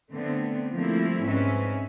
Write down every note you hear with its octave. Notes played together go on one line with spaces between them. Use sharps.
D3 A3 B3 C4
F3 G3 A3 A#3 C4 E4
G#2 C4 C#4 B4 E5